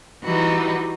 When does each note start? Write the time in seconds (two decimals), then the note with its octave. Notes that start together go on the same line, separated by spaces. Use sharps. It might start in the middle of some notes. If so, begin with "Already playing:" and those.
0.23 E3 G3 D#4 F#4